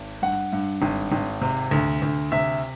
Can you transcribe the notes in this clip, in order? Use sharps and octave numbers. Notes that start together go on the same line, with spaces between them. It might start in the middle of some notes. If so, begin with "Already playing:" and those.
Already playing: G#1
G2 F#5
G2
G#1
G#1
C3
D2
D2
C3 E5